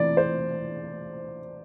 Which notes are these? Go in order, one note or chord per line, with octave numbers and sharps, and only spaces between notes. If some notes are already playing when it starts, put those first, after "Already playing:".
Already playing: E3 A3 E4 D5
C5